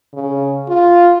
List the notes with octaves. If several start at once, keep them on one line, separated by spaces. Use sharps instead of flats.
C#3
F4